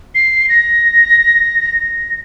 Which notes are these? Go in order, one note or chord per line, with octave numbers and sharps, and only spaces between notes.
C7
A#6